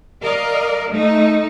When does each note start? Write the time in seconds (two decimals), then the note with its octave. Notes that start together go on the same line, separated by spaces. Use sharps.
0.22 A#4 D5 D#5 F5
0.90 A3 D#4